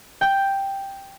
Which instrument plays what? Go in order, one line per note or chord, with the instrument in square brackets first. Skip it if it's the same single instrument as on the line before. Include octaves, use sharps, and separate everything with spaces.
[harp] G5 G6